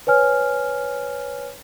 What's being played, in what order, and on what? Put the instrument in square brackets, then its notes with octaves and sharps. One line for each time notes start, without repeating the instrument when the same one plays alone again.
[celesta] B4 C#5 G#5 F6